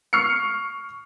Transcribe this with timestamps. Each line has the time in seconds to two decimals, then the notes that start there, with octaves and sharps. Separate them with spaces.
0.13 C#6 F6 C7 C#7